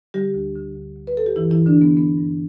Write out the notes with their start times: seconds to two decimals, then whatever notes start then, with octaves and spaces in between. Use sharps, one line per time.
0.14 D3 G3 G4
0.34 D2
0.55 D3
0.75 D2
0.96 D2
1.07 B4
1.16 D2 A4
1.26 G4
1.36 G2 E3 E4
1.51 E3 E4
1.57 G2
1.66 D3 D4
1.77 D3 B3
1.97 G2 B3
2.17 G2